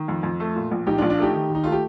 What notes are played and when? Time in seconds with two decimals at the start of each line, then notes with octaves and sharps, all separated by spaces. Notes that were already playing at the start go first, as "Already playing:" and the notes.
Already playing: D#3
0.08 F2
0.23 F2
0.40 A3
0.56 A#2
0.71 A#1
0.87 A#1 D#4 G4
0.98 D4 F4
1.02 A#1
1.10 D4 F4
1.18 A3 D#4 G4
1.33 D#3
1.50 D#2
1.55 D#4
1.64 A3 F4
1.72 G4